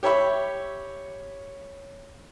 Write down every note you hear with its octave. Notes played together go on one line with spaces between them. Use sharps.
G4 C#5 E5 B5 C#6